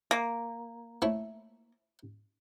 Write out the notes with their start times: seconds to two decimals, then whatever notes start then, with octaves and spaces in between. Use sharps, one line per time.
0.11 A#3
1.02 A3 E4 C#5